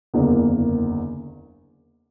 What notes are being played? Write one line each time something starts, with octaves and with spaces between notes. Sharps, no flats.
F#1 E2 D3 A#3